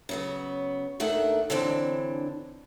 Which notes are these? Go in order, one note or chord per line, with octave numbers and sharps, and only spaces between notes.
C#3 F#3 B3
D#2 D#3 A3 D4 F#5
D3 E3 F#3 C4 D4